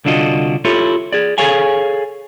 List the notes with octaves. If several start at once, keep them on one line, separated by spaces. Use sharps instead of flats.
C2 D3 D4 F4 F#4 D#5
E4 F4 G4 A4 C#5
G#4 D5
G#4 A4 C#5 F5 G#5